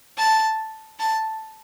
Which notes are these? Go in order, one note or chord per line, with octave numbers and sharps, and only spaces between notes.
A5
A5